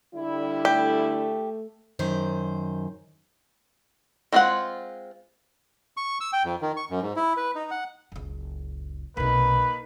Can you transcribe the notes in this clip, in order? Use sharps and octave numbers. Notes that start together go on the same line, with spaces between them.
D3 G3 E4
A3 G4
F#2 D#3 C5
G#3 C4 F4 C5 F#5
C#6
E6
G5
F2
D#3
C#6
F#2
G#2
E4
B4
D#4
F#5
F#1 C#2
B1 C3 A#3 D#4 B4